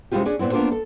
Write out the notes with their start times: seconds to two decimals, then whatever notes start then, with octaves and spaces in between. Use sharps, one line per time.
0.12 C3 G#3 C#4 E4 F4 G4
0.25 C#4 D4 G#4
0.39 A#2 B3 C4 E4
0.51 A#3 B3 D4 F4 A4 C5
0.72 A4